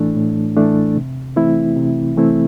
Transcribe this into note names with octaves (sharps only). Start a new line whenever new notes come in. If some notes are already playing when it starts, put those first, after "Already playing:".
Already playing: A2 E3 A3 D4
A2
E3 A3 D4
C3
E3 A3 C4 E4
C3
E3 A3 C4 E4